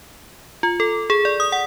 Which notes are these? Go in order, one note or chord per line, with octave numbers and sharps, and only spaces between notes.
F4
A4
G#4
D5
D#6
F#5